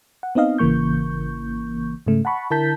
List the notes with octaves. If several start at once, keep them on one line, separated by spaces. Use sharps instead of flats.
F#5
B3 C4 D#4 D#5 F5
G#1 C#3 E3 A#3 C#6 G6
G#2 C#3 A3
F#5 A5 B5 C#6
D3 E4 A#4 A5 G6 B6